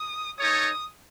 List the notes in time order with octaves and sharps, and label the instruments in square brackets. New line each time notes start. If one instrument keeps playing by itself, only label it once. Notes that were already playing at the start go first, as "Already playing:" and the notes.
Already playing: [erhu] D#6
[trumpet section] D#4 A4 C#5 [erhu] D#6